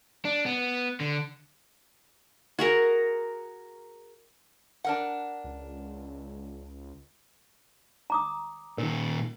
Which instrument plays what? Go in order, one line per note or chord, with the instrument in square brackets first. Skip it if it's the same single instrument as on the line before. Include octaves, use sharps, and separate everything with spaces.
[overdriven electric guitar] D4
B3
D3
[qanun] F#4 G#4 A#4
[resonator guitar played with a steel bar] D4 A#4 F#5
[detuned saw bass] C#2
[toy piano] A#5 D6 D#6
[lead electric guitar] A#2 D#3 [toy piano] A#4